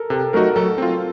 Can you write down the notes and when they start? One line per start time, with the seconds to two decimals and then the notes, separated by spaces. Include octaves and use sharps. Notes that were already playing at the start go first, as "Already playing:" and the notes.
Already playing: A4 A#4
0.10 C3 A4
0.33 F#3 A3 D#4 F#4 A#4
0.56 F#3 A4
0.78 C4 F4